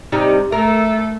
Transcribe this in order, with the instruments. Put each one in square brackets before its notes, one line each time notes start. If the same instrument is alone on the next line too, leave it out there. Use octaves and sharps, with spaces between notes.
[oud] C3 G3 D#4
[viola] A3 A4 [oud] A#4 [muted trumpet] E5